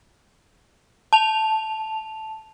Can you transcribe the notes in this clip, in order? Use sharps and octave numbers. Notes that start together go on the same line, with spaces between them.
A5 F7